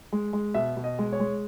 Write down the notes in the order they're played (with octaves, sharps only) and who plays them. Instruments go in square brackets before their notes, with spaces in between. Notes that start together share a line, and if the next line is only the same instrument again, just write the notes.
[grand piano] G#3
G#3
B2 E5
B2
D#5
G#3
C#5
G#3